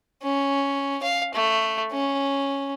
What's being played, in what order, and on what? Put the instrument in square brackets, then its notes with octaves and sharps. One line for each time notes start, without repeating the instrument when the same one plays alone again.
[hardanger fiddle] C#4
F5
A3
C#4